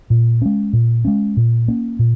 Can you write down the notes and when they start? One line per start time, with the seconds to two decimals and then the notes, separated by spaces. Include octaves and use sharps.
0.10 A#2
0.42 G#3 C#4
0.73 A#2
1.05 G#3 C#4
1.37 A#2
1.68 A#3 C#4
1.99 A#2